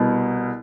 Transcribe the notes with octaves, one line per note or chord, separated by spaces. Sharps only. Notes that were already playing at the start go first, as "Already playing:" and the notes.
Already playing: C2 B2